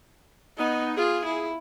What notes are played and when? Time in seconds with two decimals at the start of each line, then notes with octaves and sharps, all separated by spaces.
0.58 B3 D#4
0.97 F4 G#4
1.25 E4